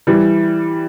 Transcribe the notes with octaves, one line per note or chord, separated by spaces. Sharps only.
E3 G3